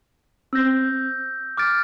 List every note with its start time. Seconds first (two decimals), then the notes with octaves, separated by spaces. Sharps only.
0.53 C4 E6 G6 A#6
1.57 D6 F6 A6 D7